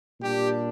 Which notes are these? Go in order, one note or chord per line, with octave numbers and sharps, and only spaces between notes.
A#2 G3 D4 G4